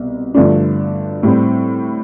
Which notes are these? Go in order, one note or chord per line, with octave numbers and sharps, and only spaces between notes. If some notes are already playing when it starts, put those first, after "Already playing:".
Already playing: C2 B2
G2 D3 F3 A3 D4
A2 G3 C4